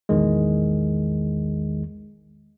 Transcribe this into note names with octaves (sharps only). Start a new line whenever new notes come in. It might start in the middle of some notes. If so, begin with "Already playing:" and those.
A#1 E2 D#3 G#3